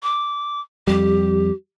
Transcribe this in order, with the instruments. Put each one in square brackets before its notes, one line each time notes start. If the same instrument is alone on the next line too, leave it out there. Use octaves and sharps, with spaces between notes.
[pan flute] D6
[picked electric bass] F2 G3 [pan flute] G4